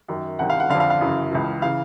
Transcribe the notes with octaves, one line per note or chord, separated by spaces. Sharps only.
F#2 D#3
C2 C3 D#3 F#5
F5
F#5
F2 D3 F5
F5
F5
F#2 C#3 E3
C#2 C#3 E3
C#3 E3 F5